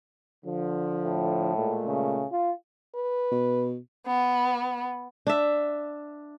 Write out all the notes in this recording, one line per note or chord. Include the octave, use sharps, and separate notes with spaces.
D3 F3
A2
A#2 G#3 A3
C#3
F4
B4
B2
B3
D4 E5